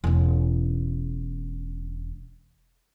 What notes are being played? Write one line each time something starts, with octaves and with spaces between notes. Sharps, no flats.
E1 C#4